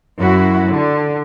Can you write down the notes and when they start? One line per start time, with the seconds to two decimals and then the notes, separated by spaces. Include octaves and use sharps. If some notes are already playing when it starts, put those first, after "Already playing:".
0.18 F#2 E4 F#4
0.70 D3